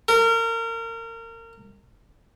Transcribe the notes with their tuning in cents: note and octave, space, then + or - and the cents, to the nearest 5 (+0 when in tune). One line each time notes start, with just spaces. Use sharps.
A#4 -30